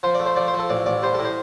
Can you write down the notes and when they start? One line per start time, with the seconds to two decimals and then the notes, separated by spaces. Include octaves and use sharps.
0.03 F3 C5
0.14 D5
0.19 A3
0.26 C5
0.36 F3 D5
0.47 C5
0.54 F3
0.59 A4
0.70 A1 D5
0.86 A1 D5
1.02 G3 C5
1.14 A2 A4
1.25 C5